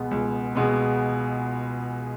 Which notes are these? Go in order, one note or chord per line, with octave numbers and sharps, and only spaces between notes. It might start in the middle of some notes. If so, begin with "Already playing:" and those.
Already playing: C#2 B2 G#3 B3
C#2
B2 G#3 B3